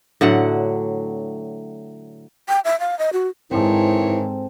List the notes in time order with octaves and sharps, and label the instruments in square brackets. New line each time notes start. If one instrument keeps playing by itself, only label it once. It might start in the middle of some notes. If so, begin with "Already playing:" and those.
[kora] A2 D3 F#3 F#5
[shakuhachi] G5
E5
F5
D#5
F#4
[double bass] G#2 [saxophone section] D#3 E3 C#5 [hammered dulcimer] C4 A4 [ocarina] E4